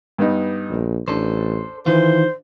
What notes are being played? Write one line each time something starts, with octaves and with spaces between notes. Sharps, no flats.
G2 B3 D#4
A#1
A1 D4 A4 C5
D#3 E3 F4 C5